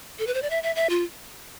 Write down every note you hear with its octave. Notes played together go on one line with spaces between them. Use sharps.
A4
B4
C5
D5
E5
E5
E5
F4